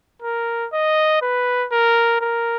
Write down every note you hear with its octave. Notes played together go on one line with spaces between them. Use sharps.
A#4
D#5
B4
A#4
A#4